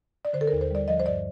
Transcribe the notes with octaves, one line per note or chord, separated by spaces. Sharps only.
D5
D3 C5
A4
A#4
D#2
C5
G3 D5
F3 D#5
C5
G2 D5